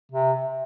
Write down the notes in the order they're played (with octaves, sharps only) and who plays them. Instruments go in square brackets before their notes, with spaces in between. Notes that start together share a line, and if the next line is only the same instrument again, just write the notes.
[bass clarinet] C3